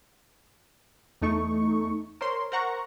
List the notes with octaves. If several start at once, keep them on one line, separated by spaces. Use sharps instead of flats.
E2 A3 D#4 C#6
A#4 C5 C#5 C6
A#4 C5 F#5 A#5 C#6